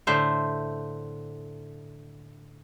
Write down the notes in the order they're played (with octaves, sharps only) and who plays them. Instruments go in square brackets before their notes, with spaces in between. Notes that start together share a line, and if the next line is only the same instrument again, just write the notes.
[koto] A2 D3 C5 E5